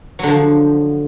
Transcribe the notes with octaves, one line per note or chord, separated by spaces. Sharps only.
D3 F3 F#3